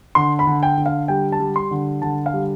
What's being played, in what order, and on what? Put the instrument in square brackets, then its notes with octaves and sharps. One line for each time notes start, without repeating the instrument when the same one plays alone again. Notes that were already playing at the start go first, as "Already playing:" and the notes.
[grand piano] D3 C6
B5
D3
G5
D3
F5
G3 G5
A5
G3
C6
D3
D3 A5
F5
G3